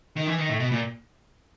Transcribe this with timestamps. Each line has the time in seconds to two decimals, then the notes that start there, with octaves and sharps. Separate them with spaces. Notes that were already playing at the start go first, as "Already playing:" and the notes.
0.17 D#3
0.27 E3
0.38 D#3
0.49 A2
0.60 B2
0.72 A#2